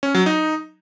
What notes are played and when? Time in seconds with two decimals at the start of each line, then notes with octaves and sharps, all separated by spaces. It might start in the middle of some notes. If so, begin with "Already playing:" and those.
0.03 C#4
0.15 F#3
0.26 D#4